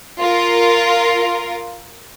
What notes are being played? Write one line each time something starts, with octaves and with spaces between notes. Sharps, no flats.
F4 A#4